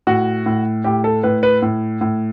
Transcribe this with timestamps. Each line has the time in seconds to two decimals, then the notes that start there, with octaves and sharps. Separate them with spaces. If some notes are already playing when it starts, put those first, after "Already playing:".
0.07 A2 F#4
0.46 A2
0.84 A2 G4
1.04 A4
1.23 A2 B4
1.43 B4
1.62 A2
2.01 A2